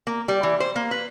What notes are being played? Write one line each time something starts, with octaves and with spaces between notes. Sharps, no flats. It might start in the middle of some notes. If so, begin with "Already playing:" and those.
A#3
G3
E3
C5
A#3
B4